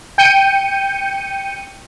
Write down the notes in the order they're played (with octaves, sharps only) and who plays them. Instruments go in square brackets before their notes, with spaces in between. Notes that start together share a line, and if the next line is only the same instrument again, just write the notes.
[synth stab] G5 G6 C#7 D#7